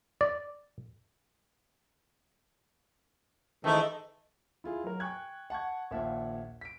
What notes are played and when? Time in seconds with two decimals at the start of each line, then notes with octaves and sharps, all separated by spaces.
0.21 D5
3.64 G#2 D#3 E3 A3 D#4
4.64 E4 F4 G#4
4.84 F#3 A#4
5.00 G5 G#5 C#6 F#6 G#6
5.50 F#5 A5 C#6 G#6
5.91 A#1 D#2 A#2 E5 F#5 A5
6.61 B6 D7